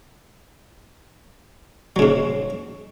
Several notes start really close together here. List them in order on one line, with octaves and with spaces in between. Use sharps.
F#3 C#3 G#2